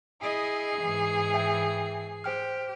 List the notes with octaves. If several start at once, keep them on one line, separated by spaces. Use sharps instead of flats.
E4 G#4 D#5 C7
G#2 E3
E5 G5 G#5
G4 C5 G5 F6